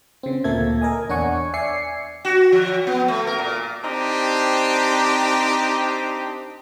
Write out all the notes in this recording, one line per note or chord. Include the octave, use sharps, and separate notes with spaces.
C#3 C4
D2 A#2 A#3 A4 E5 G#6
A#4 D#5 G#5
E2 D4 C#5 F#5 G#5 C#6
D5 E5 G#5 C7 C#7
F#4
F3
B3
A3
A#4
A#2
C4 D4 D#4 G4